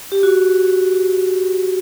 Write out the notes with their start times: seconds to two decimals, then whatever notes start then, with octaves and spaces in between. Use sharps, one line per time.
0.12 G4
0.23 F#4